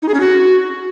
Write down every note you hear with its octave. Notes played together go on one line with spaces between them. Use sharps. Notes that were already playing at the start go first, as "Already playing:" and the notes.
D#4
G#4
C#4
F#4